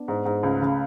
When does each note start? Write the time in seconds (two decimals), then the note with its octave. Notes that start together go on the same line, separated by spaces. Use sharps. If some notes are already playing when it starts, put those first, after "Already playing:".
Already playing: B3 D4
0.08 G#2
0.25 G#2
0.43 C#2 A3 C#4
0.62 C#3